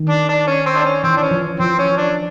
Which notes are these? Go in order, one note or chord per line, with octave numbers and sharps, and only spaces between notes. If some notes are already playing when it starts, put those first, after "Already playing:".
Already playing: D#3
D4
D4
C#4
C4
D4
C#4
E3 C4
D4
C#4
F3
F3 C4
C#4
D4